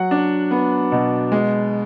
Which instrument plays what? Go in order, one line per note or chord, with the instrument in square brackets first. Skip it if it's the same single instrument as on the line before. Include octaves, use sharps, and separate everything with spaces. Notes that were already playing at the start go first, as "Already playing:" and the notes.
Already playing: [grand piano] F#3 F#5
D4
B3
B2
G#3